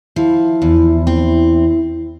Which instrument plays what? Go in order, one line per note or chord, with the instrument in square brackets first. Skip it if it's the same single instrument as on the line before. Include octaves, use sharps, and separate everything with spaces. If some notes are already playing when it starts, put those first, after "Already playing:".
[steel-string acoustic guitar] F3 [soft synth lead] E4
[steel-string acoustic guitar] E2
C4